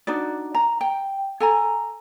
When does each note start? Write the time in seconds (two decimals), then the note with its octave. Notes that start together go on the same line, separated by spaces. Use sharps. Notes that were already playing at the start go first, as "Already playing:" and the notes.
0.07 D4 D#4 F#4 D5
0.55 A#5
0.81 G5
1.40 A4 G#5 A#5